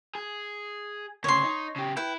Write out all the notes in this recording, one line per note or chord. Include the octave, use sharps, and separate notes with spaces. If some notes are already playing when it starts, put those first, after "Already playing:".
G#4
D2 C#3 C#5 C6
D#4
C#3 G4
E4 B4 G5